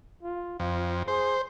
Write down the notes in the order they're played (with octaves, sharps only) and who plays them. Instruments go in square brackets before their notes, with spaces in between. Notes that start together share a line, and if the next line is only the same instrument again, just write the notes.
[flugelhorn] F4
[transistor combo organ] F2 [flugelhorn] F4
[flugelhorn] G#4 [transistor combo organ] C5